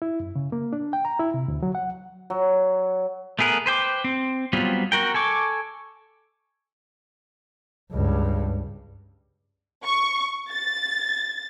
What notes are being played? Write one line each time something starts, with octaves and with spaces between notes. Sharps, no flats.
E4
F#2
C#3
A#3
D4
G5
A#5
E4
C3
D2
F#3
F#5
F#3
A3 B3 G#4 A#4 B4
B4 C5 G5 D6
C4
F#3 G3 B3 C4 F4
F#4 A#4 G5
A4 G#5 C#6 D6
C#2 G2
C#6
A6